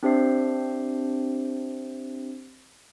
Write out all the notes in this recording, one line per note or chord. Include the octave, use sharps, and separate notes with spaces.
C4 D4 G4 C5 E5 C7